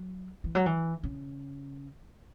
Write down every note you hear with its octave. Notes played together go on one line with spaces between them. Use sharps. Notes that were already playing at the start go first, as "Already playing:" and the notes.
Already playing: F#3
E3
F#3
E3
C#3